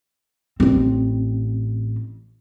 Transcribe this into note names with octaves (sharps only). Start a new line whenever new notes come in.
A1 C4